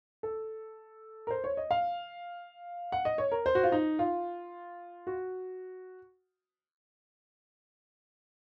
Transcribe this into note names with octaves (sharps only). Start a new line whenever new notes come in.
A4
A#4
C5
C#5
D#5
F5
F#5
D#5
C#5
A#4
C5
F#4
F4
D#4
F4
F#4